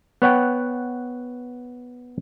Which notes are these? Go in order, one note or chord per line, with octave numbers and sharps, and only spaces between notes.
B3 C#5 F#5 G5